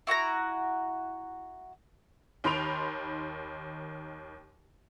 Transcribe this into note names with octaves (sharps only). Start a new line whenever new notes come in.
E4 F#4 F#5 A#5
D#2 D#3 B5 C6 D7 F7